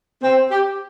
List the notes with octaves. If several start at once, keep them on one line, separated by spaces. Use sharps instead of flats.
C4
G4